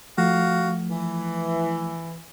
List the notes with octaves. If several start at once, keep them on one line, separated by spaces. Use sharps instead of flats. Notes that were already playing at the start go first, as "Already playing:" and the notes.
F3 A3 F#4 F5
E3